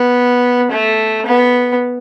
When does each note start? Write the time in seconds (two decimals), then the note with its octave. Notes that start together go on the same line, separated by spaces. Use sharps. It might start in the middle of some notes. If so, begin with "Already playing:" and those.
Already playing: B3
0.72 A3
1.26 B3